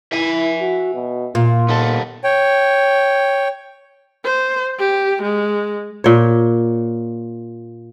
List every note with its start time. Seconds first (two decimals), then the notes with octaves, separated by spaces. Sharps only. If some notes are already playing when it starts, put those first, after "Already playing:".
0.12 E4 E5 G#5
0.61 F#4
0.94 B2
1.35 A#2 F4
1.69 D#2 B3 A4
2.24 C#5 G5
4.25 C5
4.79 G4
5.22 G#3
6.04 A#2 C#5